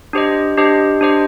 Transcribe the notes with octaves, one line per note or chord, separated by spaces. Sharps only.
D4 G4 C5 D#5
D4 G4 C5 D#5
D4 G4 C5 D#5